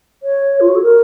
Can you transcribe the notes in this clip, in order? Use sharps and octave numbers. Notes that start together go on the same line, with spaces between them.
C#5
F4
F#4
A4
A#4